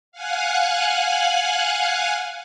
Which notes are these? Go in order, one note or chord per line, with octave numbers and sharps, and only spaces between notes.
F5 F#5 G#5 F#6